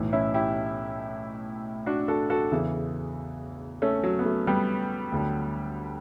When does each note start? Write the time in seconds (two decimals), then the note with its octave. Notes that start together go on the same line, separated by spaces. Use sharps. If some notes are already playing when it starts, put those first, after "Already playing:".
Already playing: B1 A2 E3
0.13 C#4 E4
0.34 E4 G4
1.86 D4 F#4
2.08 F#4 A4
2.30 F#4 A4
2.52 E2 C#3 E3
3.82 A3 C#4
4.04 F#3
4.19 B3
4.25 F#3 A3
4.47 G3 B3
5.12 D2 D3 F#3